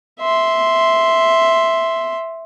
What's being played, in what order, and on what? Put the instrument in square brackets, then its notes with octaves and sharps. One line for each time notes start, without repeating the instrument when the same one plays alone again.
[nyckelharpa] E5 C6